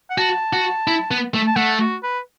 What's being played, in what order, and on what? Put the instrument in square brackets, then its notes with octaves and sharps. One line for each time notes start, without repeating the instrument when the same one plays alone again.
[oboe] F#5
[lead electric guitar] F#4 [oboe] A5
[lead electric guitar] F#4
E4
B3
A3
[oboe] A5
[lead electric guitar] A3 [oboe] F#5
[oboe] F#4
B4